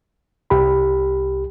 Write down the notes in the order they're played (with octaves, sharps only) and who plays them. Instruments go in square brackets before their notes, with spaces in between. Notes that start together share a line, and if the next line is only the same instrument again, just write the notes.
[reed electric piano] C2 G4 B5